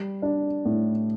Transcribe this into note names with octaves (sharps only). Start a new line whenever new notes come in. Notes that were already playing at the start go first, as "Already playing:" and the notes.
Already playing: G3
D4
A2